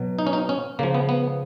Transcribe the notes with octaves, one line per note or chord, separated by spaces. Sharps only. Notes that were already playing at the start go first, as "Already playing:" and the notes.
Already playing: B2 F#3
D#4
C#4
D#4
C#4
C#3 F3 A#3
B3
B3